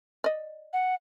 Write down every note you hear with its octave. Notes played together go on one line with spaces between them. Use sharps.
D5 D#5
F#5